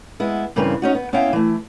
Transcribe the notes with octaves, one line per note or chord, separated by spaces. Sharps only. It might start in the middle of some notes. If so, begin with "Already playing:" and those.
G#3 B3 E4
G2 C#3 E3 C4 A#4 B4
C#4 D#4 F#4
B3
B3 C#4 E4 E5 F5 G5
E3 A3